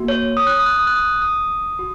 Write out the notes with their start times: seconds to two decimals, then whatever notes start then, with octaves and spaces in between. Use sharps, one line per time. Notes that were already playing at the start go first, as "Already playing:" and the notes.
Already playing: A#3 F#4
0.08 C#5
0.37 D#6
0.47 F#6
0.57 D#6
0.66 F#6
0.76 D#6
0.87 F#6
0.96 D#6
1.22 D#6
1.79 F#4